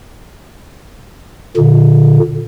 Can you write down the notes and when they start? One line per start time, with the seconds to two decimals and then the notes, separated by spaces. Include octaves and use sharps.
1.57 A#2 D3